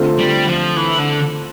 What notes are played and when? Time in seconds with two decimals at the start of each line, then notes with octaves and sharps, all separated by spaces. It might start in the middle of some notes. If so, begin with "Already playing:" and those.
Already playing: D3 A3 C4 F4
0.19 G3
0.48 F3
0.77 E3
0.98 D3